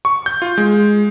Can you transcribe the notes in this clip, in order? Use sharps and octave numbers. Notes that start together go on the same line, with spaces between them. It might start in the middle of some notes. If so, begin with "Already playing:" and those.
C#6
G6
F4
G#3